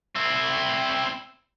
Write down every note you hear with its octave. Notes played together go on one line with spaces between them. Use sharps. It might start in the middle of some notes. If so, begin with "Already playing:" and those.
C4 E4